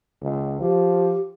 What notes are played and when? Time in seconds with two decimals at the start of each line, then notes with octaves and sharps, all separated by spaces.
0.22 C#2
0.60 F3 G4